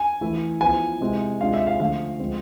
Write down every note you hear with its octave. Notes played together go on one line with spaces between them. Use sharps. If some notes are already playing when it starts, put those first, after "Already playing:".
Already playing: G#5
E3 A3 E4
F3 B3 E4 G#5
C3 G#3 C4 E4
C3 G#3 D4 F4 F5
E5
F5
D3 F3 A3 F5
F3 G#3 C4 F4